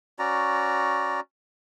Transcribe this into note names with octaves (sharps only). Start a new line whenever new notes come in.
C#4 F#4 D5 A#5